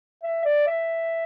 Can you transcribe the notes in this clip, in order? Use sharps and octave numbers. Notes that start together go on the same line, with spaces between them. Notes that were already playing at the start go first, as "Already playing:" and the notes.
E5
D5
E5